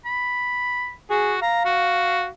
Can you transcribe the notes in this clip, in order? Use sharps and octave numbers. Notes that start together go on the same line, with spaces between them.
B5
F#4 G#4
F5 A#5
F#4